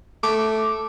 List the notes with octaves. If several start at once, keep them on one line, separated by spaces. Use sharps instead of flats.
A3 D6